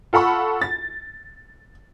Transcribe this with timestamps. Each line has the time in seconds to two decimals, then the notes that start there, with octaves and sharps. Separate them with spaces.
0.13 F4 A4 F#5 B5 C#6
0.62 A6